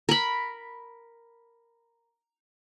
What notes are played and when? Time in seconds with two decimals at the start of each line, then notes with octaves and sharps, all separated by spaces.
0.09 A#4 B5